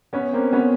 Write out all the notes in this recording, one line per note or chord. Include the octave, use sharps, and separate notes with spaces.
B3 C#4
A#3 C4
B3 C#4